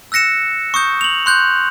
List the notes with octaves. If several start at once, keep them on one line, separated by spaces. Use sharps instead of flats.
E6 F#6 A#6 C#7 E7
C#6 D#6 G6
F7 F#7
C6 F#6 G6